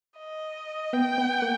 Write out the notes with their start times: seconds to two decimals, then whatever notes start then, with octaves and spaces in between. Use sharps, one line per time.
0.18 D#5
0.93 B3 G5
1.18 B3
1.42 A#3